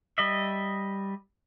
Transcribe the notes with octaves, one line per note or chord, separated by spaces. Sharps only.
G3 D#5 E5